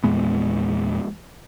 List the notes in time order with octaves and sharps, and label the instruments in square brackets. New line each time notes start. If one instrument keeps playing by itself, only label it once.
[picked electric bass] E2 A#2 G#3 B3